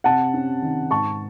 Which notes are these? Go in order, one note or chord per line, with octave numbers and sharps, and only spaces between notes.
C3 F#5 A5
C#4
D#3
G#2 A5 C#6